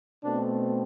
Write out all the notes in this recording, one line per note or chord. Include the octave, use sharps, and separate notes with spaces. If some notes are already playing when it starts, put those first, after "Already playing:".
B2 A3 C4 D4